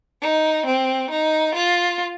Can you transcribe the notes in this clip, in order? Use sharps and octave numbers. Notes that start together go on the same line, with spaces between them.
D#4
C4
D#4
F4